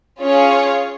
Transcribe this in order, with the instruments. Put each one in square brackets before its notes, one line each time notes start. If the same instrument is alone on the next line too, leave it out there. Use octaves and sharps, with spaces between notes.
[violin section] C#4 F4 G#4 C#5 F5